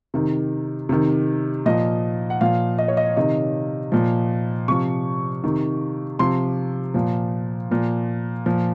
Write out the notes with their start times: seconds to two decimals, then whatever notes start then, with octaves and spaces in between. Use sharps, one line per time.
0.14 C3 D#3
0.89 C3 D#3
1.66 A#2 F3 D#5
2.30 F#5
2.41 A#2 F3 F5
2.78 D#5
2.88 C#5
2.97 D#5
3.17 C3 D#3 D#5
3.92 A#2 F3
4.68 C3 F3 C#6
5.44 C3 D#3
6.19 C3 F3 C6
6.94 A#2 F3
7.71 A#2 F3
8.46 A#2 F3